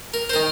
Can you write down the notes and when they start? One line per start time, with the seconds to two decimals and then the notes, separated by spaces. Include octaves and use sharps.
0.14 A#4
0.29 C5
0.33 D#3 A#4